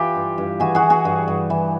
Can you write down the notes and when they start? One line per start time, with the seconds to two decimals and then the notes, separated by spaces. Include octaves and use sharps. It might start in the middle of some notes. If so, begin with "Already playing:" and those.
Already playing: E3 F4 G4
0.16 G2
0.38 G2
0.60 E3 F#4 G#4
0.75 F#4 G#4
0.82 E3
0.90 F#4 G#4
1.05 G2
1.28 G2
1.50 E3